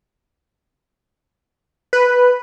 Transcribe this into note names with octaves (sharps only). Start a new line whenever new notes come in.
B4